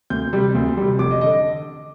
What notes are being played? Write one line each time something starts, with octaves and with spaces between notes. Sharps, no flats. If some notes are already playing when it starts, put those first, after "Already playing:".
D2 G6
C3 G3
D2
C3 G3
F1 D6
D#5
D3 D#5